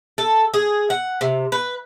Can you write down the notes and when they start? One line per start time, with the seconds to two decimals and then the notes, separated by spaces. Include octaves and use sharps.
0.18 A4
0.54 G#4
0.90 F#5
1.21 C3
1.52 B4